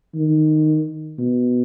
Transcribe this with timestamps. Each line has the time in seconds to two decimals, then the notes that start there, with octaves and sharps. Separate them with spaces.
0.15 D#3
1.18 B2